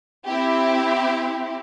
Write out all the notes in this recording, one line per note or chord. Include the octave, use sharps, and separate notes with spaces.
C4 E4 G4